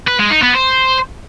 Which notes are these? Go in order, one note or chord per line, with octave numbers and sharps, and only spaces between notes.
B4
G#3
D#4
B3
C5